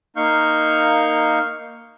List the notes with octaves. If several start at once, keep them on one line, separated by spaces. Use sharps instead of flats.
A#3 D#4 F5 C#6 F6 G6